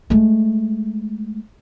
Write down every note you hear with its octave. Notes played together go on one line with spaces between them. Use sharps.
G#3 A3